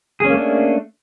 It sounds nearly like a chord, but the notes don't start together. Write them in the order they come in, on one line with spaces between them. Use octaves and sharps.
G#4 C#4 A#3 A3 D4